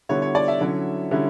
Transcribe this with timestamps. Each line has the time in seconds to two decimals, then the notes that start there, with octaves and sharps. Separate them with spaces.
0.09 D3 G3 B3 E4 C#5
0.22 C#5
0.35 D5
0.48 E5
0.60 D3 F#3 C#4 E4
1.11 D3 G3 C#4 E4